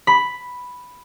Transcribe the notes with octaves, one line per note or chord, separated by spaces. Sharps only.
B5